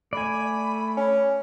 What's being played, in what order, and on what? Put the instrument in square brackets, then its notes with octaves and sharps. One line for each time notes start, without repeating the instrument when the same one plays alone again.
[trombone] A3 [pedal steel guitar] D5 G#5 [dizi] B5
[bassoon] C#4